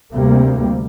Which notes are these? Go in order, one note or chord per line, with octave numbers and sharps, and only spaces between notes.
D2 C3 G3 A#3